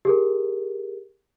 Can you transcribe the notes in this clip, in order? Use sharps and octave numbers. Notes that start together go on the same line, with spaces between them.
G4 G#4 A#4